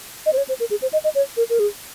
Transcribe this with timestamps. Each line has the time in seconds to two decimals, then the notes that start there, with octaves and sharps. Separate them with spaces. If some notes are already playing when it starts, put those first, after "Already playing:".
0.26 D#5
0.33 C5
0.37 C#5
0.49 C5
0.60 A#4
0.70 G#4
0.82 C5
0.93 D#5
1.04 D#5
1.15 C#5
1.37 A#4
1.50 A#4
1.59 G#4